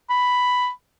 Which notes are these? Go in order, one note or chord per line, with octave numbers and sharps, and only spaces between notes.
B5